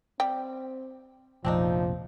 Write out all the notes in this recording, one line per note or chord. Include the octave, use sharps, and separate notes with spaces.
G3 C4 G5
F1 A#1 F3 C4 D4 D#4